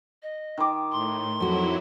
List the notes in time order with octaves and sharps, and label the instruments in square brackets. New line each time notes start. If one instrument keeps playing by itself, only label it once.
[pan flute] D#5
[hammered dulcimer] D#3 D6
[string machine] A2 [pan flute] C6
[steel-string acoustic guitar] F2 F#4 [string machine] F#3 E4